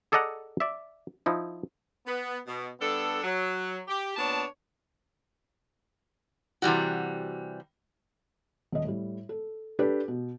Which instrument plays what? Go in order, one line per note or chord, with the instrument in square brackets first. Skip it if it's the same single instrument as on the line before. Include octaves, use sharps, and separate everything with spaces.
[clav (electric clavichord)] G#4 A4 D5 D#5 F#5 A#5
D5 E5
F3 D#4 E4
[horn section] B3
B2
G2 B3 D4 A4
F#3
G4
A#2 B3 D4 C#5 A5
[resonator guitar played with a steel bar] C3 E3 G3 F#4
[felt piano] D#1 D#5
A2 G3
A4
D4 G4 A4 B4
B2